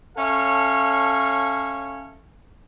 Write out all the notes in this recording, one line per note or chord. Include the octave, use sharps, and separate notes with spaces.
C#4 A4 C#5 E5 F5